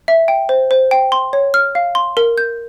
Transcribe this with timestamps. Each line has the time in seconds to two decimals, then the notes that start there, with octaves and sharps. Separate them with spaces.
0.08 E5
0.28 G5
0.49 C5
0.71 C5
0.91 G5
1.12 C6
1.33 C#5
1.54 F6
1.75 F5
1.95 C6
2.17 A#4
2.38 G6